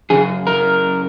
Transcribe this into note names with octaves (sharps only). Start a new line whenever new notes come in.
F#2 C#3 G#4
A#4